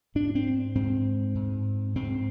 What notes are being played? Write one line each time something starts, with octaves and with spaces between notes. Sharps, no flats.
G#2 D4
C4
G#2 C4
G#2
G#2 C4